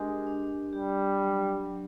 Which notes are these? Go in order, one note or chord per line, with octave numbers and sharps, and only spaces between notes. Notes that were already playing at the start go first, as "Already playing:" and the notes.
Already playing: G#3 D4 G4 A#4
D4
G3 G4
F#3
F#3